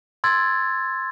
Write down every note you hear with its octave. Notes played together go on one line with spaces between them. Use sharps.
C6 E6 G#6 A6